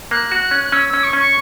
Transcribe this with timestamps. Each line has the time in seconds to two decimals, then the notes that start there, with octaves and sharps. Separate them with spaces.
0.11 A#3 F#6
0.32 F#4
0.51 C#4
0.64 F#6
0.72 C#4 E6
0.88 E6
0.94 C#4
1.03 C#6
1.13 C#4
1.18 C#6